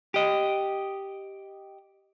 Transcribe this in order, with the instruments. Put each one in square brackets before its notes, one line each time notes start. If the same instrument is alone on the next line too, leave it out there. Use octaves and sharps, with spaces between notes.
[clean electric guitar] G4 D#5